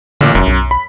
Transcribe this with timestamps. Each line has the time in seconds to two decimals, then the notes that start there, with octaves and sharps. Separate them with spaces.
0.21 A1 A#2 D3
0.35 F1 F#2
0.47 B1
0.71 B5